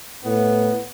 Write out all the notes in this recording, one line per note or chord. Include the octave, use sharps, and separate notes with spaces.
A2 B3